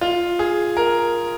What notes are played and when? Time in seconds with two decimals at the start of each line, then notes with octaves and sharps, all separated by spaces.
0.01 F4
0.39 G#4
0.77 A#4